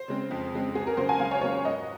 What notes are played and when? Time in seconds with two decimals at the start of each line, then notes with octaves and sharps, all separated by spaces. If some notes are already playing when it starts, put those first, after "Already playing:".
Already playing: C5
0.08 C#3 G#3 C4
0.31 F2
0.52 C#3 G#3 C4
0.75 C#2 G#4
0.87 A#4
0.97 C#3 F#3 A#3 C5
1.09 G#5
1.19 C#2 F5
1.31 C#5
1.41 C#3 F#3 A#3 C#5
1.65 G#2 D#5